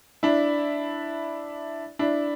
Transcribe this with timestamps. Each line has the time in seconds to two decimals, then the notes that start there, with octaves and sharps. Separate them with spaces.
0.23 D4 E4
1.99 D4 E4